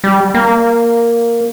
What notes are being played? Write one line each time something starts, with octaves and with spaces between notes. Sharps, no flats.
G3
A#3